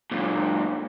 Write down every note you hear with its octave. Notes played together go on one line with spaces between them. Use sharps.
F#2 A#2